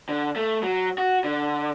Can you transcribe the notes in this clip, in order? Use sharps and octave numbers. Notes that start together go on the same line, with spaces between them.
D3
A3
F#3
F#4
D3